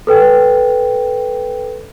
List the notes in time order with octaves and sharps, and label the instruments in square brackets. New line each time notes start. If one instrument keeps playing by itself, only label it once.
[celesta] A4 B4 G5